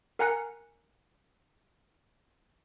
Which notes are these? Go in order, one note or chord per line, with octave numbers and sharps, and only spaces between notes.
A#4 F#5 G#5 A#5 F#6 C#7